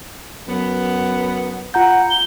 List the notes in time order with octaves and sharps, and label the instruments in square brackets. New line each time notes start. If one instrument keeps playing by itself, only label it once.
[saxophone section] F#2 B3
[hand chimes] F4 A#5 G6 [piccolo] F#5
[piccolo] G7